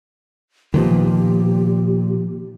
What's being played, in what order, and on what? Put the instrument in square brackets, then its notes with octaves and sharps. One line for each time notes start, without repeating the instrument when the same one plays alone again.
[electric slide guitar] A#2 [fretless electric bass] D#3 F3 B3 [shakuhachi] G4